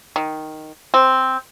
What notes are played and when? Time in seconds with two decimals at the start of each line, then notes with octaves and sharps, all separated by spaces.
0.16 D#3
0.94 C4